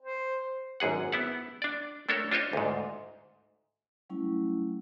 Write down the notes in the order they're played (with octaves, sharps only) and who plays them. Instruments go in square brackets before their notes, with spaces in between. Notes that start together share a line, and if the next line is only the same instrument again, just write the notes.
[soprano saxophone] C5
[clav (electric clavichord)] G#1 F#2 G#4 F#5
B3 E4 F#5
D4 D5
A3 D4 A4 A#4 C#5
D4 F4 C5 C#5 D#5
D2 G#2
[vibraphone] F#3 G3 A3 C#4 E4